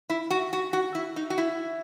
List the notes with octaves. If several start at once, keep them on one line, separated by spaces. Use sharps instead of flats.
E4
F#4
F#4
F#4
E4
D#4
F#4
E4